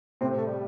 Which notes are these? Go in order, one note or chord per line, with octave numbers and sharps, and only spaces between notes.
A2 C3 C4
A3
G3